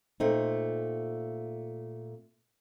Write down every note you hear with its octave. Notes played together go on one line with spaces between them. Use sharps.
A#2 A3 C4 D#4